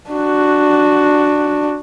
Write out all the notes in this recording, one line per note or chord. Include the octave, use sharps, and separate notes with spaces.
D4 F#4